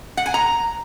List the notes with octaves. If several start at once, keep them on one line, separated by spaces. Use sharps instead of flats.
F#5
G#5
A#5